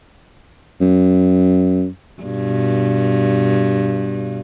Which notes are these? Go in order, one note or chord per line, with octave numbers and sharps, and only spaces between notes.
F#2
G2 B2